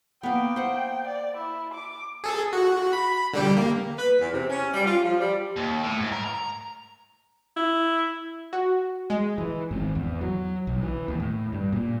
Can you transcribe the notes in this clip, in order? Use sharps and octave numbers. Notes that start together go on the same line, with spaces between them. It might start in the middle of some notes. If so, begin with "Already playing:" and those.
A#3 B3 G5
C5 F#5
D5
E4
D6
G#4 A4
F#4
B5
D3 G3 G4
A#3
B4
E2
C3
C#4
G3
F4
F3
G3
D#2
A2
G#2
A#4
A#5
E4
F#4
G#3
E3
G#1
E2
F#3
B1
E3
D#2
A2
G2
A#2